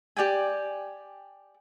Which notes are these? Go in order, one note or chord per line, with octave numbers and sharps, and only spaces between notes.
G4 D5 G5 G#5